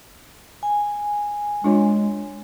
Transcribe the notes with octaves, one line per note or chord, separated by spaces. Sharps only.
G#5
G#3 D4 F4 C#5